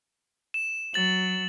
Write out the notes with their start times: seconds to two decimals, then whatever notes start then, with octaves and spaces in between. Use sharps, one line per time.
0.54 E7
0.94 F#3 A6 F#7